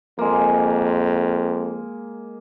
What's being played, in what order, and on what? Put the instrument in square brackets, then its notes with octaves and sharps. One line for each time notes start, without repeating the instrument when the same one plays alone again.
[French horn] F2 [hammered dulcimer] G#3 A#3